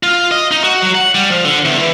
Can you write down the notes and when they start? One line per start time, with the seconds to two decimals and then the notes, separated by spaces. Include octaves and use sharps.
0.03 F4
0.31 D#5
0.51 D#4
0.64 F#4
0.82 F#3
0.95 F#5
1.15 G3
1.30 F3
1.45 D3
1.65 E2
1.78 E3